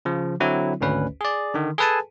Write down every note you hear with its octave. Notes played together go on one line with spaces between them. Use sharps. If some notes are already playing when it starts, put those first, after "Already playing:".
C#3 F3
D3 F#3 C4 E4
G#1 D2 C#4 B4
G#4 D5
D3 D#3
G#4 A4 B4 G#5 A5